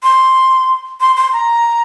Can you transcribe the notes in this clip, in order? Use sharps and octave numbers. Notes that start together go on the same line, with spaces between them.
C6
C6
C6
A#5